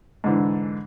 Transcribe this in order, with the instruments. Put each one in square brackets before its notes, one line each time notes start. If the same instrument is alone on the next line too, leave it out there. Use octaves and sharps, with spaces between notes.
[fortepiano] G#2 D3 E3